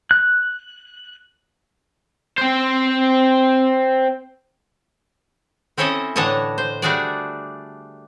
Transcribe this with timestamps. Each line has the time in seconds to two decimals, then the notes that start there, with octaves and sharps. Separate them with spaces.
0.11 F#6
2.38 C4 C5
5.77 C4 C#4 E4 A4 C#5 D#5
6.16 A2 D3 E3 C#5 D#5 A5
6.58 C5
6.82 G3 A3 D4 F#4 G#4 D5